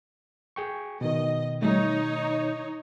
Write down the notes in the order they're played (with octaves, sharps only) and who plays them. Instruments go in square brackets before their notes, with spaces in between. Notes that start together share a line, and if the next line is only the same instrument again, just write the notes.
[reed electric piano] G#4 G5 C#6
[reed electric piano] B2 D#3 [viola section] D#5
[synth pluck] G3 A3 [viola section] D#4 C#5